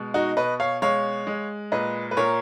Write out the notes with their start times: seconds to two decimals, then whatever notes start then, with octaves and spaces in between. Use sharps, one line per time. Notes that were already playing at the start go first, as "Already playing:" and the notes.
Already playing: B2 G#3
0.14 D#4 F#4
0.37 B2 B4 D#5
0.60 C#5 F5
0.82 G#3 C#5 F5
1.27 G#3
1.72 A#2 B4 D#5
2.11 B4
2.17 A#2 A#4 C#5